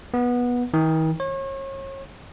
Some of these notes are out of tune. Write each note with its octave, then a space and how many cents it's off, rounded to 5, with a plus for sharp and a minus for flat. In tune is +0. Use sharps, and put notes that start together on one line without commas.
B3 -15
D#3 +45
C#5 -35